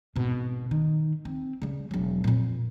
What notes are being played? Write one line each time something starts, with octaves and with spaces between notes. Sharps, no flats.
G#1 B2
D#3
C4
C#3 G3
E1 F#3
F2 A#2